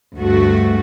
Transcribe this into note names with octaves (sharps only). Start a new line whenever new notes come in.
D2 G2 A3 F#4